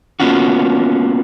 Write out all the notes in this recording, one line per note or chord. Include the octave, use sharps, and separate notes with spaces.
A#3 B3 C#4 F4 F#4